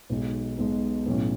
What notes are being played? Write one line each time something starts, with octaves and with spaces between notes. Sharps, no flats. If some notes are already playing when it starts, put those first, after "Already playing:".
B1 B2 G#3 D#4
B1 B2 G#3 D#4
B1 A2 F#3 C#4